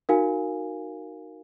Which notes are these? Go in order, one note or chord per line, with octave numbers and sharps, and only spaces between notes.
D#4 F#4 A#4 F5 G#5